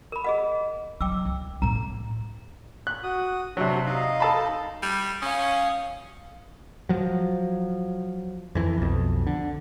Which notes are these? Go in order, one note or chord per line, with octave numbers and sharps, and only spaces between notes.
A#4 B5
G#4 D#5 F#5
F#3 G5 D6 E6
C#2
A2 A#3 A#5
F#6
F#4 D#6
C3 F#3 D4 F#4
D#4 D#5 F5
A4 A5 B5
G3
C#4 F5 D#6
F3 F#3
F2 E3
B1 F2
D3